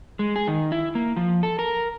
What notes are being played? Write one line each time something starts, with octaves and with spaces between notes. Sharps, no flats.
G#3
G#4
D#3
E4
A#3
F3
A4
A#4